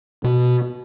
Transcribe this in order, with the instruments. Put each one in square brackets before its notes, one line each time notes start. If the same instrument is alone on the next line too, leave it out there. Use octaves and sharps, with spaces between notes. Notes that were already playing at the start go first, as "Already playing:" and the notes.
[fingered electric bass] B2